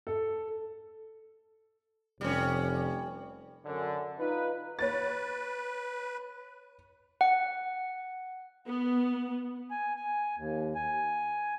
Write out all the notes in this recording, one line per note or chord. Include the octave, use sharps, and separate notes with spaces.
A4
F1 G3 C#4
F#2 D3
D#4 F4 B4
B4 C#5 A6
F#5
B3
G#5
G#5
D#2
G#5